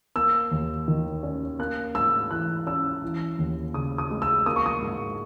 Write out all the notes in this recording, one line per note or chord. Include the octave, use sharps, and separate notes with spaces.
A#3 E6
D#2
D#3
C#4
A#3 F#6
G#2 E6
E3 F#6
C#4 E6
E3
D#2
C#3 D#6
D#6
G#3
E6
A#3 D#6
C#6
D#6
G#2